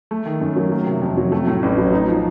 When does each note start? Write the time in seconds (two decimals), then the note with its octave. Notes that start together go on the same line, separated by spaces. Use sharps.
0.11 A3
0.26 D#3
0.41 F#2
0.56 F#3
0.71 A#3
0.86 C3
1.02 F2
1.17 F#3
1.32 A3
1.48 A2
1.62 A1
1.77 F#3
1.93 D#4
2.08 F3